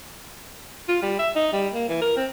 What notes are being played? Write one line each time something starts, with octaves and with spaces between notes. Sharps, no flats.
F4
G3
E5
D#4
G3
A#3
E3
A#4
C4